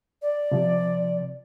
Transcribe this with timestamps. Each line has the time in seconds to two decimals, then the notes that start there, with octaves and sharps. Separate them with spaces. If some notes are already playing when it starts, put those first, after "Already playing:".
0.22 D5
0.51 C3 F3